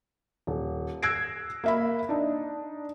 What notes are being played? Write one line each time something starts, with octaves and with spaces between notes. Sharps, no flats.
D#1
E6 F#6 G#6 A#6 C7 D7
A#3 E5 B5
D4 D#4